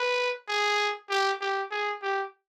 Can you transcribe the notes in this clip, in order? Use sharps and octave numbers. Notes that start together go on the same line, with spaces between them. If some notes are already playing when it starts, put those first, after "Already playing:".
Already playing: B4
G#4
G4
G4
G#4
G4